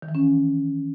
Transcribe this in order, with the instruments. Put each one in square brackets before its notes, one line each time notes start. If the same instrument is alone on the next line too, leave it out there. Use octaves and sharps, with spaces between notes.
[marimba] D#3
E3
C#4